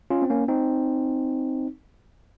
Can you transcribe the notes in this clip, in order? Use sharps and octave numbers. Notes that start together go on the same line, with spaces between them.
C#4 F4
C4
A#3 C#4
C4 D#4